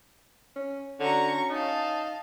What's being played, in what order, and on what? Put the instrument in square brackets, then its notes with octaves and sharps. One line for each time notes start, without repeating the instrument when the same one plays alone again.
[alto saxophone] C#4
[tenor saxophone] D3 [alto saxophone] C#4 [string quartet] F#4 A#5 C#6
[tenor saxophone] D#4 [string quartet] F5 A5